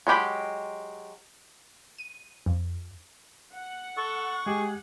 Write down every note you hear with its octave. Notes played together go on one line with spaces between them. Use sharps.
F#3 G#3 G4 B5
D#7
F2
F#5
A4 C#6
G#3 G4 G#4